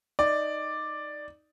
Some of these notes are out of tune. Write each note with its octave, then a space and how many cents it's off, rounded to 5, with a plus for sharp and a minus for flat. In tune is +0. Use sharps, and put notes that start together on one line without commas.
D#4 +0 D5 +5